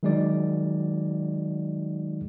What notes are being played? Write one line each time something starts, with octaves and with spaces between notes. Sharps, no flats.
D#3 F#3 G#3 D#4 F#4 D5